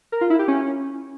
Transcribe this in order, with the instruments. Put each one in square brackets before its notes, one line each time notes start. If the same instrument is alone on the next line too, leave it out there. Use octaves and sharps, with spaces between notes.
[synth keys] A#4
F4
E4
G4
C#4